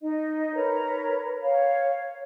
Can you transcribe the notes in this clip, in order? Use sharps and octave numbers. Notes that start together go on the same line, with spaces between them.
D#4 D#5
A#4 B4 C#5 A#5
C#5 F5